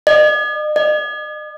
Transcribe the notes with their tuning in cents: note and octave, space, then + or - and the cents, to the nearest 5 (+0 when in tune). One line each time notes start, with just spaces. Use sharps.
D#5 -45
D#5 -45